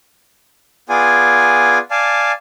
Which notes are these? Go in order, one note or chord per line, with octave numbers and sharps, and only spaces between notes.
B3 F4 G#4 D5 G#5
D5 F5 G#5 A5